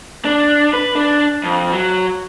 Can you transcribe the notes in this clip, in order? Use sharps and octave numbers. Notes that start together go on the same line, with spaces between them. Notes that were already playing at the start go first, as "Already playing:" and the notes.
D4
B4
D4
F2
F#3